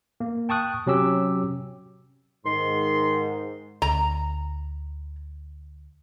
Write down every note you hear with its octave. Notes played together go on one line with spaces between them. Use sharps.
A#3
G5 A5 C#6 D#6 F#6
C3 F#3 C#4 G4 E6
G#2 D#3 C6
D2 A#5